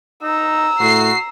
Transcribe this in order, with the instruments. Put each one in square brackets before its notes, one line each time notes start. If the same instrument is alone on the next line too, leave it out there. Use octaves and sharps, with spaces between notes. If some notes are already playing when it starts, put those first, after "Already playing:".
[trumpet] D#4 [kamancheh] A#5 E6
[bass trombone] A2 [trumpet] F#4 [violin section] C7